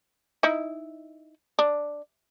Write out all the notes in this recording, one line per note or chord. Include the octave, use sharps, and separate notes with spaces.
D#4 E4
D4